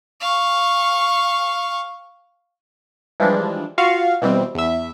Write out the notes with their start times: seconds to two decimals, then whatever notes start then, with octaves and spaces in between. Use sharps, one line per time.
0.20 F5 C#6
3.20 E3 F3 G3 G#3 D4
3.78 F4 F#4 F5 C#6 C#7
4.22 B2 E3 G3 C4
4.55 E2 E5